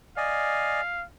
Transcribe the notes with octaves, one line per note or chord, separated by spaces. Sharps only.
D5 D#5 F5 G#5